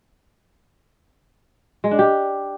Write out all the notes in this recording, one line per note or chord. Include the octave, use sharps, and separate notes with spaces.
G#3
D4
G4